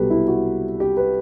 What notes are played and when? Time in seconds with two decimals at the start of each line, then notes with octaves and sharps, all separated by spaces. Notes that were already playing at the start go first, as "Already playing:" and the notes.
Already playing: C2 B2 F#3 G4 A4 B4
0.10 E4
0.28 F#4
0.80 G4
0.97 B4